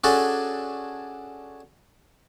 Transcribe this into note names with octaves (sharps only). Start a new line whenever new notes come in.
C#4 D4 F#4 G#4 A4